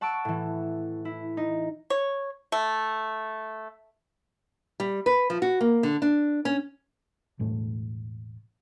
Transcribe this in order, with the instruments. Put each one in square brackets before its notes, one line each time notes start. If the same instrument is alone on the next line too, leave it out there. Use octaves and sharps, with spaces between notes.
[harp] F#5 A5 C#6 E6 D7
A2 E3
E4
D#4
[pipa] C#5
A3
[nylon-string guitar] G3
B4
F3
F#4
A#3
D3
D4
C#4
[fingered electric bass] E1 A2 A3